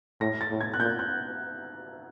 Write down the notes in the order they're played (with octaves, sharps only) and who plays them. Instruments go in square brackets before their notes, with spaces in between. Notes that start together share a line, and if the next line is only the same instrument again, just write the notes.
[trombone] A2 [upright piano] A#6
[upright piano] A6
[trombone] A2
[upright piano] G#6
F#6
[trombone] A#2 [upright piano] G6
[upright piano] F#6